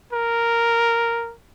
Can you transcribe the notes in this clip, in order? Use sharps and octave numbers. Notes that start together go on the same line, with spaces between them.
A#4